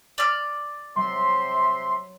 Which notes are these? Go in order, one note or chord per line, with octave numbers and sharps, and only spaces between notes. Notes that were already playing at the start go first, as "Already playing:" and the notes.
D5 F6
C3 F#3 E5 C6